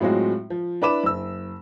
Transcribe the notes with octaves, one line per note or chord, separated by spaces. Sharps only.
A2 F#3 G#3 C4 F4 F#4
F3
D4 E4 B4 B5 D6 E7
F#1 E6